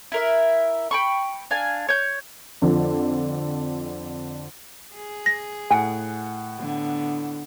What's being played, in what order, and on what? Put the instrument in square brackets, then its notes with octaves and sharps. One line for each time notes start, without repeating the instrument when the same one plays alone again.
[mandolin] E4 A#4 E5
G5 B5 C#6
D4 F5 G#5
C#5 G6
[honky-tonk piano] F2 D3 F3
[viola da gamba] G#4
[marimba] A#6
[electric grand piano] A2 F#5 C#7 [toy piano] G#5
[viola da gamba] D3 B3